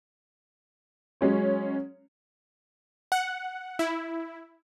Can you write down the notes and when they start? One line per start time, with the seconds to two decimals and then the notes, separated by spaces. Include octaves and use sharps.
1.21 F#3 G#3 C#4 C#5
3.12 F#5
3.79 E4